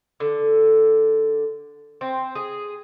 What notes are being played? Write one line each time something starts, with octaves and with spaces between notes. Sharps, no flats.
D3
C4
G#4